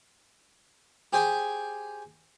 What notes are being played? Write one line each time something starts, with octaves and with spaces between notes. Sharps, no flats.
G4 G#4 C5 G5 G#5